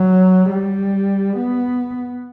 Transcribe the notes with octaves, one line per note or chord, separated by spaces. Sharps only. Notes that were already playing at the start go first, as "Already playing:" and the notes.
Already playing: F#3
G3
B3